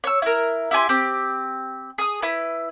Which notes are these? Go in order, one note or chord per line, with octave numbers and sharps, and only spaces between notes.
C#5 E6
E4 A#4
E4 G4 G#5 C6
C4 G4
G#4 D#6
E4 B4